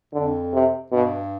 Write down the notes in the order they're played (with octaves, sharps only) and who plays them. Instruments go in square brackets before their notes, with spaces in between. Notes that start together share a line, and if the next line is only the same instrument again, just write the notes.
[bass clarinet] F2 [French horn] D3
[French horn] C3
[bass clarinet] G2 [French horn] B2